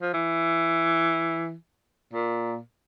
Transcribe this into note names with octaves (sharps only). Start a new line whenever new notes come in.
F3
E3
A#2